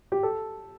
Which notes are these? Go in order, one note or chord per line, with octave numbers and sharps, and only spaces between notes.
G4
A4